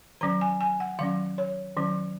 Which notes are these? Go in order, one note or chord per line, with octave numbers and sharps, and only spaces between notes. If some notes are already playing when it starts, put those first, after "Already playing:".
D#3 F#3 C#4 A#5
G#5
G#5
F#5
D#3 F#3 C#4 F5
C#5
D#3 F#3 C#4